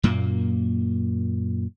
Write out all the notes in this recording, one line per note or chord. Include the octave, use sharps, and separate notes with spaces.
F#2 A#2 A#3